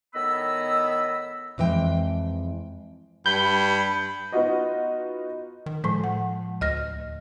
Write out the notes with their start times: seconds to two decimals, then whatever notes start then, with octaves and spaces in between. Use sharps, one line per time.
0.14 A2 D#3 B3 D#5 B5 E6
1.58 F2 E3 G#3 G5
3.26 G2 B5 G6
4.32 B3 D#4 F4 F#4 D#5
5.66 D#3
5.84 A2 F3 G#3
6.04 F#5
6.61 D2 D#5 F6 A#6